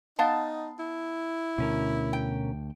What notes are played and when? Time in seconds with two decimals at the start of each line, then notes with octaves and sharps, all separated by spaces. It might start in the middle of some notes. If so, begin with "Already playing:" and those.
0.19 B3 D#4 F5 A5
0.79 E4
1.58 D2 B2 C#4 A#4
2.13 G5